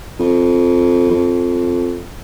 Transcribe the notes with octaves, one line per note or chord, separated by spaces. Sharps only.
F2
F2